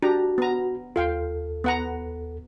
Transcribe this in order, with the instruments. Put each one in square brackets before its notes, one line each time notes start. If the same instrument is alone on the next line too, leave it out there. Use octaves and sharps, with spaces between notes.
[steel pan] D4 G4 A#5 [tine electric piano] F#4
[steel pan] B3 A#5
[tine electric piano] D#2 A4 [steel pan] F4 F5 G5
[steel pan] B3 F#5 A#5